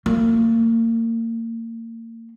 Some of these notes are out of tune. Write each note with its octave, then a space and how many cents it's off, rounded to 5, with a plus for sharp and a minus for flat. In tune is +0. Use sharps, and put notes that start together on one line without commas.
A#3 -35